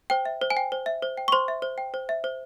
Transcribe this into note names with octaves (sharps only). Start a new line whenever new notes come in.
C5 G5
E5
C5
G#5
G5
C5
E5
C5
G5
C#6
C5 C6
E5
C5
G5
C5
E5
C5